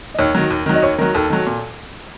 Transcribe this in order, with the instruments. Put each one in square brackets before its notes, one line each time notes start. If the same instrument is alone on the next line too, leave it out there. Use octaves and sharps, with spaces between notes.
[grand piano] D#5
[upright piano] D#2 [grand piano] C#5
[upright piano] D#3 F#3
D#2
D#3 F#3
[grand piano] D#5
[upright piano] D#2 [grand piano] C#5
[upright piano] D#3 F#3 [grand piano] A#4
[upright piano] D#2 [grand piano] A4
[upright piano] D#3 F#3
A#2